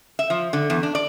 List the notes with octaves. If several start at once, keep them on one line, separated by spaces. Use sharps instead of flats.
E5
F3
D3
E2
D4
D5